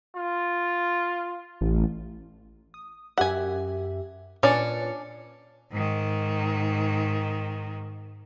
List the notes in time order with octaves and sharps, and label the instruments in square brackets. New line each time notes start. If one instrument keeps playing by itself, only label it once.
[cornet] F4
[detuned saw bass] A1
[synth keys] D#6
[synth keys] F#2 G4 E5 [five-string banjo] F#5 G#5
[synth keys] A#2 B4 C#7 [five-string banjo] C#4 D4 D5
[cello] G#2 D#3